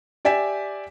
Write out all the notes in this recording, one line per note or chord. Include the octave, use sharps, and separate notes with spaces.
G4 D5 E5 G#5 B6 E7